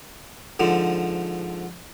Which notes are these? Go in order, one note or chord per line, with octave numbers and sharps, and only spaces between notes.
G#2 D3 F3